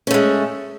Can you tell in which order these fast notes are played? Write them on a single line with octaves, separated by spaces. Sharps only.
C#4 A3 G#3